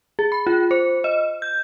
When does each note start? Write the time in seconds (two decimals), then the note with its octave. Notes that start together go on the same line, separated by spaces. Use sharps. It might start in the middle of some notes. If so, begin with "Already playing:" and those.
0.19 G#4
0.32 B5
0.47 F4
0.71 C5
1.04 D#5
1.42 G6